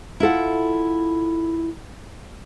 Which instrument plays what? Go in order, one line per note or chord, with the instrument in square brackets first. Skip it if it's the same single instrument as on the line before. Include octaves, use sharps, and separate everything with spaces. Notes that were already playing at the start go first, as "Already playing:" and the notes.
[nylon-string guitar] E4 F4 A4 F#5